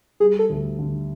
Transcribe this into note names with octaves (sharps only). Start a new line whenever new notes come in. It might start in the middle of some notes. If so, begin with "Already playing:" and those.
G3 G#4
A4
D2
D3